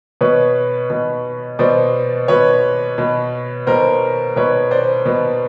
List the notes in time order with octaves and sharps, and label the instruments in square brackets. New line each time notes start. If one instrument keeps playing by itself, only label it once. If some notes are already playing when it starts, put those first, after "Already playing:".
[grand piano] B2 B4 C#5
B2
B2 C5 D5
B2 B4 C#5
B2
B2 A#4 C5
B2 B4 C#5
C5 D5
B2